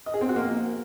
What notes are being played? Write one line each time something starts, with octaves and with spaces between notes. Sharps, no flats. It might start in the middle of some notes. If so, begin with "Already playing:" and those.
D#5
G#4
C4
F#4
A#3